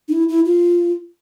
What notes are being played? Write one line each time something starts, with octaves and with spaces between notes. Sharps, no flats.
D#4
E4
E4
F4